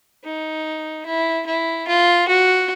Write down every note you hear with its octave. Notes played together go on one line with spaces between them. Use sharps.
D#4
E4
E4
F4
F#4